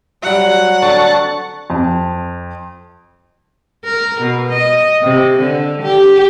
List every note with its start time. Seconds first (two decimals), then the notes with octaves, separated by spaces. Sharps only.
0.23 F#3 G3 F#4 F#5
0.82 D3 C4 A5 C#6
1.70 F2
3.85 A#4
4.22 B2
4.53 D#5
5.02 C3
5.40 D3
5.83 G4